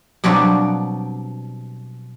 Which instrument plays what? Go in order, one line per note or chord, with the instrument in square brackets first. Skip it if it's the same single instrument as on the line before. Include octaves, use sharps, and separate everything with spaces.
[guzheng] B2 F#3 G3 C4 D4 F4